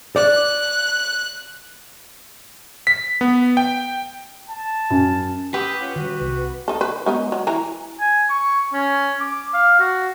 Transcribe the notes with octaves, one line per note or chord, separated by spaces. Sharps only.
D5 F#6
B6
B3
G5
A5
F#2
G4 B4 C6 D#6 E6
C#4 F4 F#5
D#3 G3 F#4
C2 C3
D#4 A4
B4
G#3 B3 D#4
F#3
E3 A#5
G#5
C#6
C#4
D6
F5
F#4